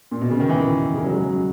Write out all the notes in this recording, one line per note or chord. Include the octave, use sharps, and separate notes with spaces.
A#2
B2
C#3
D#3
E3
D#3
C#3
F#3
G#3
F#3